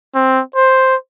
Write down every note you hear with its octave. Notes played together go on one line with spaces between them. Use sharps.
C4
C5